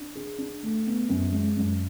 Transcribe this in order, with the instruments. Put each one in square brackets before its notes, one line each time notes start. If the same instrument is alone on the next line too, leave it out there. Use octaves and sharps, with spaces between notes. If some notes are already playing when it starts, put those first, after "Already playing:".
Already playing: [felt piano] D4
G#4
D4
A3
B3
F#2
G#3
F#2